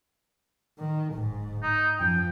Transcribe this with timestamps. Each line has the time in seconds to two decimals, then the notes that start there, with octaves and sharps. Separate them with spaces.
0.79 D#3
1.14 D1 G#2
1.63 D#4
2.00 F#2 F3 G5